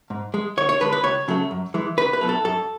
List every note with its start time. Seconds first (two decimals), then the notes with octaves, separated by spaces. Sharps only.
0.10 G#2
0.34 G#3
0.57 D2 C#5
0.69 C#5
0.81 D3 G#3 B4
0.92 B4
1.04 C#2 C#5
1.28 C#3 F#3 A3
1.51 F#2
1.74 E3 G#3
1.97 C#2 B4
2.13 B4
2.21 B2 F#3 A3
2.29 A4
2.45 F#2 A4